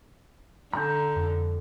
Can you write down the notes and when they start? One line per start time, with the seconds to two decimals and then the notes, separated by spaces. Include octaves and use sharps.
0.74 D3 A#5 G6
1.16 F2